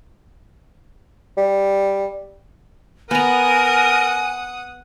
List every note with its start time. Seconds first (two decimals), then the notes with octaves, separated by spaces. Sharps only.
1.37 G3
3.11 B3 A#4 F#5 G#5 A#5 D#6